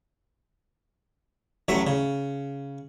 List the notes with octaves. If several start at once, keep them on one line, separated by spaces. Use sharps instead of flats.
A1 F#3 A3 E5
C#3